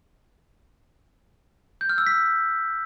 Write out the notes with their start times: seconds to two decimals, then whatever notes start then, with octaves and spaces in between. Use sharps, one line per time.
1.81 G6
1.89 F6
1.98 E6
2.07 B6